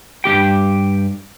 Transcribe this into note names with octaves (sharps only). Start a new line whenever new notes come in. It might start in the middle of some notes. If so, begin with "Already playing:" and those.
G2 A#3 G4 G5